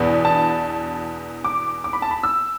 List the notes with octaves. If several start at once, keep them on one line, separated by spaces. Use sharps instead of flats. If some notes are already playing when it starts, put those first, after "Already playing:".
Already playing: E2 B2 B3 D4
A5
D6
D6
B5
A5
B5
E6